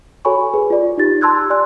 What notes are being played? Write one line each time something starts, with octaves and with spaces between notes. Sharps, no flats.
F#4 A4 C#5 G#5 B5 C#6
G#4 B4
F4 D5
D#4 F4 G4 A6
A5 C6 E6 F#6 G#6
D5 G#5 C6 F#6